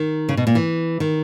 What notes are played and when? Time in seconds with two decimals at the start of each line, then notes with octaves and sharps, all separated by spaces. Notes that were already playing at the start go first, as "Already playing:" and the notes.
Already playing: D#3
0.29 C#3
0.37 B2
0.47 A#2
0.55 E3
1.00 D#3